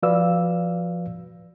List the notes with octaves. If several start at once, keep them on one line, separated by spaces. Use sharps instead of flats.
F3 F#4 B4 D5 F5 E6